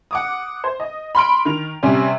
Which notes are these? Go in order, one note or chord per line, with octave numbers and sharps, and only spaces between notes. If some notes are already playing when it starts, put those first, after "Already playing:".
F#5 D6 D#6
C5
D#5
B5 C6 F6 D7
D#3 F7
C3 G3 C4 C#4